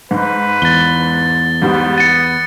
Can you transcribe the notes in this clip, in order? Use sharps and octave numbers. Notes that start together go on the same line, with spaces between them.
G#2 B4
E2 A6 G7
G#2 G3 B3
A6 C#7 D#7